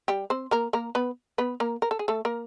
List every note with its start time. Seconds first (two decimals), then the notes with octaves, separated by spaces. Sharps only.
0.08 G3 G4
0.30 C4 C5
0.51 A#3 A#4
0.73 A#3 A#4
0.95 B3 B4
1.38 B3 B4
1.60 A#3 A#4
1.82 A#4
1.91 A4
1.99 G#4
2.08 A3 A4
2.25 A#3 A#4